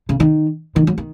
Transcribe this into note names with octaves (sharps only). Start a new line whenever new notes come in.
C#3
D#3
D#3
F#3
D#3